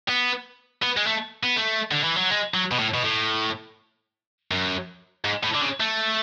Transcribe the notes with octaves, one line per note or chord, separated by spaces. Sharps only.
B3
B3
G#3
A3
B3
A3
D3
E3
F#3
G#3
F#3
B2
A2
B2
A2
F#2
G#2
A2
D3
C#3
A3